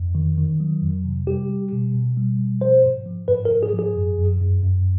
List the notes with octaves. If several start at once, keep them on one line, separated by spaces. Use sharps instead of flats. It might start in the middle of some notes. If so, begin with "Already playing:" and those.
Already playing: F2
D#3
D#3
F#3
F2
C3
G3 G4
G3
B2
B2
G3
B2
F3 C5
G#2
F3
G#2 B4
A#4
G#2
G#4
F3
G#4
F#2
F#2
F#2
F#2